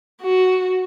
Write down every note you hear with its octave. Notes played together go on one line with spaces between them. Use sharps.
F#4